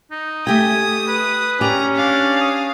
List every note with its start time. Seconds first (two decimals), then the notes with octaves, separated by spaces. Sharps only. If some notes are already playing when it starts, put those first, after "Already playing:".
0.11 D#4
0.47 A3 G4 G5 G#5 D#6
1.08 B4
1.61 C#4 G4 D5 A#5
1.96 D4 F5
2.41 D#6